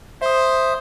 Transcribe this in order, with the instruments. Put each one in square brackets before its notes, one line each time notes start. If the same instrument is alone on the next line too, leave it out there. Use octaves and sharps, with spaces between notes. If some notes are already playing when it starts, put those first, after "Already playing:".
[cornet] C5 [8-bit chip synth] E5 D#6